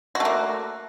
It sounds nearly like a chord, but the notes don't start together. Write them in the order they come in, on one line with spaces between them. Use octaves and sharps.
F#4 A3 A#3